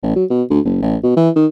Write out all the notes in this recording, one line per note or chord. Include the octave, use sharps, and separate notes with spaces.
A1
F#3
B2
D2
F#1
A1
B2
E3
D#3